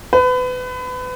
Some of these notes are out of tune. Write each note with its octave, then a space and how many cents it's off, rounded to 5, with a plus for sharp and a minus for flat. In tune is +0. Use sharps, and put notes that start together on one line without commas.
B4 +30